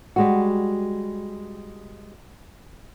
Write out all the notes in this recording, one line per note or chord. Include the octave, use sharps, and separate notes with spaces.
G3 G#3 F#4